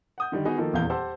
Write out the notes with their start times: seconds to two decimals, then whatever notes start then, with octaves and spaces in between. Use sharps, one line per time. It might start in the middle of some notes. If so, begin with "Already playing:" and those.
0.18 F#5 D#6 G6
0.32 D3 D#3 G3
0.45 B3 D#4 F#4 G#4 D#5
0.58 D#3 F3 A#3 A4
0.73 D#1 E2 A#2 E3 F5 G6
0.90 G4 C5 F#5 A5 E6